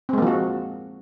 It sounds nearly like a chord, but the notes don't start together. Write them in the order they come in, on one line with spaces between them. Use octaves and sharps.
C4 G#3 A#3 F3 F#4